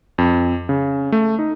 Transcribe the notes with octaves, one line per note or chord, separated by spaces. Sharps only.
F2
C#3
A3
D#4